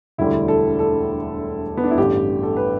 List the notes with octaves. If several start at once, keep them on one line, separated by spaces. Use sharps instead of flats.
E1 D2 D3 G3 E4
A4
A4
B3
D4
E4
A1 G2 D3 G4
A4
B4